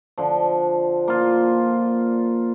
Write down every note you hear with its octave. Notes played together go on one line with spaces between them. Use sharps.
D3 F3
A#3 F4